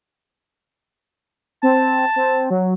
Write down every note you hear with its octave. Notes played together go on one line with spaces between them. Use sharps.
C4 A5
C4
F#3